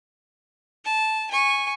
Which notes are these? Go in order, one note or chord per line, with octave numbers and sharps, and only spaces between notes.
A5
G#5 C#6